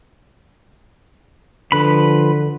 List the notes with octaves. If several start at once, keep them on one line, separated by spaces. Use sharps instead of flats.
D3 F3 B4 B5